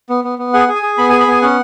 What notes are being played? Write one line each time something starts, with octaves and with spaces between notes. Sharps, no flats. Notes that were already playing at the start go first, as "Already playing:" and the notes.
B3
B3
B3
G#4 F#5
G#4
G#5
G#4
B3 B5
G#5
G#4
B5
B3 G#5
C#4 F#5